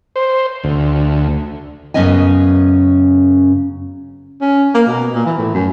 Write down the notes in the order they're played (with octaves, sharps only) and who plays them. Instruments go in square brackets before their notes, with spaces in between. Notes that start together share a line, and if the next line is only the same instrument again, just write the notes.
[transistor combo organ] C5
D2
[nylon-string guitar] F#2 C#3 B3 C#4 D#5 G#5
[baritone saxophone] C#4
A#3
B2
A#2
E3
A2
F#2